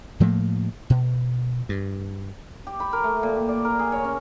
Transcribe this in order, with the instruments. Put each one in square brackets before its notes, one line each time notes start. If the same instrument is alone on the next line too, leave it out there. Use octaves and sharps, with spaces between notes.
[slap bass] A2 F3 A3 A#3
B2
G2
[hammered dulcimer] G4
B5
A#4
A3
A#2
G4
D5
A#4
G#4
C#5
C#4